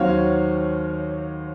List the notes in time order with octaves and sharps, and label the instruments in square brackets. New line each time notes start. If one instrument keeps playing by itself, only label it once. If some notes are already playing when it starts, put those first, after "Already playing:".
Already playing: [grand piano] D#2 D#3 F#3 C4 F#4 [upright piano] C#5 F5